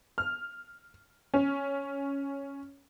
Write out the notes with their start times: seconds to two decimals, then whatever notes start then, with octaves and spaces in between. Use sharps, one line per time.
0.18 F6
1.34 C#4